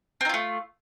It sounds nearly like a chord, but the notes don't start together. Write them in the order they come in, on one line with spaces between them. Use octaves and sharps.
C4 D#4 F4 A3